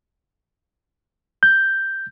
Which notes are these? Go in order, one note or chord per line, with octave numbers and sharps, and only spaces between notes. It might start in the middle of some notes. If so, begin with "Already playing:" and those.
G6